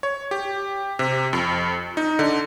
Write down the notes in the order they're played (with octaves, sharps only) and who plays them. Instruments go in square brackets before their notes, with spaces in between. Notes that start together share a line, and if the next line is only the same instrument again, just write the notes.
[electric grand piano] C#5
G4
C3
F2
D#4
D3